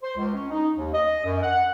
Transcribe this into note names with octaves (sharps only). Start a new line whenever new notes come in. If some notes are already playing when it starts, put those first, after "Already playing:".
C5
C#2
C#4
D#4
D#2
D#5
F#2
F#5